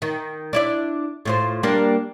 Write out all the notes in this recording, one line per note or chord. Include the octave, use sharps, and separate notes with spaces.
D#3
D4 E4 D5
A2 F4 C5
G3 A#3 D4